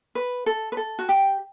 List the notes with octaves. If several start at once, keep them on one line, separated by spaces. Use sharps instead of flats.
B4
A4
B4
A4
F#4
G4